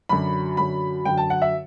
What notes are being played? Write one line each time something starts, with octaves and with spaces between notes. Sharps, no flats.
F#2 D3 F#3 B5
F#2 D3 F#3 B5
F#2 D3 F#3 G5
A5
F#5
E5